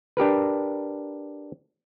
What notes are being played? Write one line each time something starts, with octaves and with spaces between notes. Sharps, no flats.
D4 G4 A#4 B4